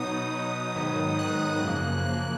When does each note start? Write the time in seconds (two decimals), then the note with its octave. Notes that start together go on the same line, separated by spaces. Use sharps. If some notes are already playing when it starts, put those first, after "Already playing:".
Already playing: B2 F#3 B3 D#4 D#6
0.32 B2 F#3 B3 D#4
0.75 G#2 D#3 F#3 B3 D#4
1.19 G#2 D#3 F#3 B3 D#4 F#6
1.62 F#2 C#3 F3 A#3
2.05 F#2 C#3 F3 A#3 F#6